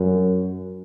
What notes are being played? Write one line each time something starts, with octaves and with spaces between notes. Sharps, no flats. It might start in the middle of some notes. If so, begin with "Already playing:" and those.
Already playing: F#2